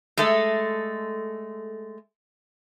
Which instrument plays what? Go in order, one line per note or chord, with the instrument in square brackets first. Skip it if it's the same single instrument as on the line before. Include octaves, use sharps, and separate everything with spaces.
[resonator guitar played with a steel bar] G#3 A3 A4